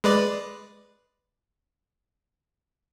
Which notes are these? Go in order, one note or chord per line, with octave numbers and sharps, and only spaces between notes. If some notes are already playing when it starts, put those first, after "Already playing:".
G#3 B4 D5